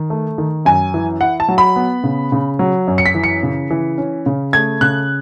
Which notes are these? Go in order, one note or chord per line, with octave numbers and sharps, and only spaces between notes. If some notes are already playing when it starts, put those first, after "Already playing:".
Already playing: D#3
A3
D#3
F#2 G#5
E3
E4 F#5
A5
F#3
B5
B3
C#3
C#3
F#3
F#2
C#7
B6
E3
C#7
C#3
E3
C#4
C#3
A3 G#6
C#3 F#6